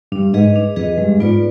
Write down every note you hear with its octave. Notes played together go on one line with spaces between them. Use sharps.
G2 D4
G#2 G#4 B4 D#5
D4
F2 G#4 B4 D#5
G2 G#3
G#2 B3 F4 B4 D5